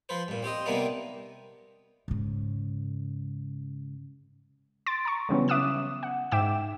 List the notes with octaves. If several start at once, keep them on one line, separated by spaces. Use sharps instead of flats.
F3 B4 C5
G2 A#2
C4 G4 C5 D#5
C3 G3 A#3 B3 D4 D#4
G#2 C#3
C6 A6 D7
A#5 C#6
C#3 E3 F#3 G3 B3 C#4
E5 D6 D#6 F#6 E7
F#5
G#2 E5 G5 D6 E7